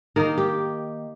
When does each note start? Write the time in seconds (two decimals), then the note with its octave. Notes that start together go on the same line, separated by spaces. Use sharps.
0.16 D#3 A#3 D#4 A#4
0.37 G4